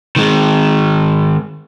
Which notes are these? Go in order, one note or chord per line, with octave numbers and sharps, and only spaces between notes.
D#3 G#3